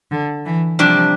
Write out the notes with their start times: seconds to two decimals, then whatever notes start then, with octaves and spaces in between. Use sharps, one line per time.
0.11 D3
0.45 E3
0.79 C3 F3 G3 D4